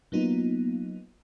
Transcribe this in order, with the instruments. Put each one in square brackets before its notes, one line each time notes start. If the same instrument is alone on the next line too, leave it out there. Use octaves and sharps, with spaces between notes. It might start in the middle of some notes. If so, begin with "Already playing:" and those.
[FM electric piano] F#3 A#3 B3 D#4 F4